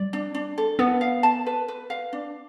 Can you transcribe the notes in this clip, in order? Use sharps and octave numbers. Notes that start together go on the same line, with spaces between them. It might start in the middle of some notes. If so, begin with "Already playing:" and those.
Already playing: G3 D5
D4
D4
A4
B3 B4
F5
A5
B4
B4
F5
D4